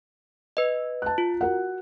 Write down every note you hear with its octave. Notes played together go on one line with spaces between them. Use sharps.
B4 D#5
A5 F#6
F4
F#4 A#4 F#5